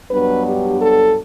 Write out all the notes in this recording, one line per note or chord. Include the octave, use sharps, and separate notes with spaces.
G2 F#3 B3 D4 B4
G4
A4